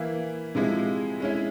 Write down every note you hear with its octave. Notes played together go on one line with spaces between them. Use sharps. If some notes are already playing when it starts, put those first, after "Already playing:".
Already playing: E3 A#3 E4
C3 F3 G#3 E4
G#3 C#4 E4